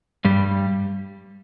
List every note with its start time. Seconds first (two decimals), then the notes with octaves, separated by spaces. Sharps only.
0.25 G2 G3